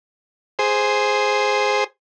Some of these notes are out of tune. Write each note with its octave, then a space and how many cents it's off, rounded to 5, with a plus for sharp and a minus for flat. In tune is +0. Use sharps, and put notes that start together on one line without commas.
G#4 +0 C5 +0